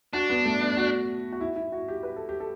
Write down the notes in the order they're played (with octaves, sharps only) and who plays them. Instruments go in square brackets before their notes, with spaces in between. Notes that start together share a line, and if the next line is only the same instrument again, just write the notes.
[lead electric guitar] D4 [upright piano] F#4
[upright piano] B3
A3
B3
F#4
F#4
E4
E4
F#4
G4
B4
A4
G4
A4